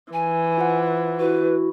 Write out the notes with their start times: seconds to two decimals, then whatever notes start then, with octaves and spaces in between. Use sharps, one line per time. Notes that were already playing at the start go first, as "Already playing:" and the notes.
0.13 E3 G#5
0.58 F4 C5 F#5
1.19 E4 F#4 B4